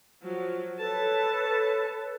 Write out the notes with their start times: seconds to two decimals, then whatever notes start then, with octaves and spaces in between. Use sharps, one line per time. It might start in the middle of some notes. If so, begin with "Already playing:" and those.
0.23 F3 F#3
0.79 A4 B4 C#5 A5